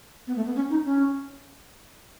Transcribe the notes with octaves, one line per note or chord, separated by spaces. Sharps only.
B3
A3
B3
C#4
D#4
C#4